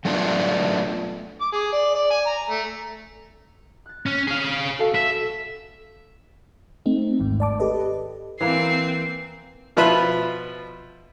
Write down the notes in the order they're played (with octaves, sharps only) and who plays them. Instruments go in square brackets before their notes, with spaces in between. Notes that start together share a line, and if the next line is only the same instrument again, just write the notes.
[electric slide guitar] F#3 A3 B3 D4 F4
[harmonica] D6
G#4
D5
D5
G#5
A#5
A3
[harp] F#6 A6
[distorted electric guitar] C#4
G#4 F5
[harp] F#4 A4 F5
[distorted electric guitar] E5
[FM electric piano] A3 C4 D#4
G#1 D#2 G#2
D5 A5 D6
G4 A4 B4 D#5
[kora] E3 A#3 [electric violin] C4 C7
[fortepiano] B2 F3 F4 B4 E5 B5